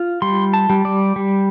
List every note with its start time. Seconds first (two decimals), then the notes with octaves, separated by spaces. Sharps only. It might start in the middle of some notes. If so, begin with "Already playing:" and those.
Already playing: F4
0.22 G3 C6
0.54 A5
0.70 G3
0.85 D5
1.16 G3